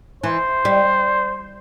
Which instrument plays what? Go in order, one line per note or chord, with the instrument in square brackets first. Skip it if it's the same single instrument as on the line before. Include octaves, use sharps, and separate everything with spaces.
[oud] E3 [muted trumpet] C5
[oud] G3